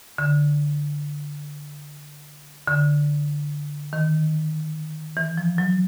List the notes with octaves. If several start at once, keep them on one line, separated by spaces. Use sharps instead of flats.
D3
D3
D#3
E3
F3
F#3